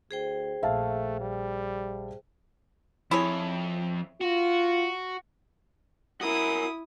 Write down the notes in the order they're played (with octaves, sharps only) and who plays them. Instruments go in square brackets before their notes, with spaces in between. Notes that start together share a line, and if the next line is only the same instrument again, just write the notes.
[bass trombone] D2 [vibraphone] G#4 C5 G5
[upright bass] A#1 [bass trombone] A3 [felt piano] E5 F5 A5
[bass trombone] G3
[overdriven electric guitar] F2 [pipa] E4 G#4 C#5
[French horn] F4 [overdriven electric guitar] F#4
[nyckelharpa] E4 D#6 [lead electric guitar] F#4 A#4